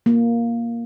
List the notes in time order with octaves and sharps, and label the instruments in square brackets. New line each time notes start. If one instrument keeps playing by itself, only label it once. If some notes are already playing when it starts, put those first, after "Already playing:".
[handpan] A#3